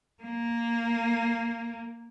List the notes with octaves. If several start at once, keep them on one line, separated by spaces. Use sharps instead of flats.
A#3